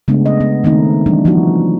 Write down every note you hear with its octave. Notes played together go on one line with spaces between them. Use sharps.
C#3 G#3 A3 B3 D4
D#5
B3
D#3 A3 B3 C4 D#4
E3 G3 D4
F3 B3 D#4 E4 F#4